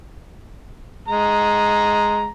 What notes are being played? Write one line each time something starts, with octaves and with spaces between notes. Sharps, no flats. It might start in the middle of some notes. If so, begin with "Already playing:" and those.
G#3 A#5